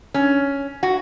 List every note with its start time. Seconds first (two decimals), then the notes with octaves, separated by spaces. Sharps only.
0.14 C#4
0.83 F#4